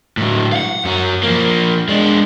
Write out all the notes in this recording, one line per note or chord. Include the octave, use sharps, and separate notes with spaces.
A2 F#3
F5 F#5
F#2 C#4
F3 A#3
G#3 D4